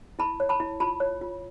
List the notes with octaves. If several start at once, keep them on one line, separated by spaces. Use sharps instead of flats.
E4 A5 B5
C#5
A5 B5
E4
F4 A5 B5
C#5
F4